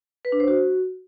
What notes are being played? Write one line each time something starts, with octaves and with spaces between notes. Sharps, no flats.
B4
D4
C5
F#4